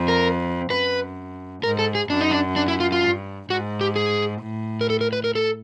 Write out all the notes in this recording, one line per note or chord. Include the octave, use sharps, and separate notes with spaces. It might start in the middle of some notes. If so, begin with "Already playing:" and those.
Already playing: F2
A#4
F#2 B4
G#2 A#4
A4
G#4
F#2 D4
D#4
D4
D4
E4
F4
F4
G2
G#2 F#4
G4
G#4
A2
A#4
A4
A#4
B4
A#4
A4